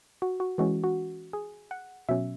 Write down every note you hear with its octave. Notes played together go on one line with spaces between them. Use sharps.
F#4
F#4
E3 G#3 C#4 F#4
F#4
G#4
F#5
B2 F#3 C#4 E5